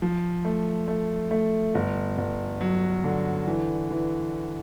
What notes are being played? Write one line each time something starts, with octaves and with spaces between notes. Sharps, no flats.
F3
A3
A3
A3
G1
G1
F#3
D3
E3
E3